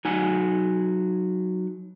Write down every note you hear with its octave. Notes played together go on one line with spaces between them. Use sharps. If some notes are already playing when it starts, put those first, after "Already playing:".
F#3 D#4 F#5 G#5